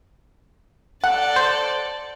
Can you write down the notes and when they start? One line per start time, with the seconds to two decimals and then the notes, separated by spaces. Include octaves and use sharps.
1.04 A4 D5 F#5
1.36 C5